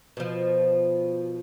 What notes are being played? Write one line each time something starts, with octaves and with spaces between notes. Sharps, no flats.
B2 F3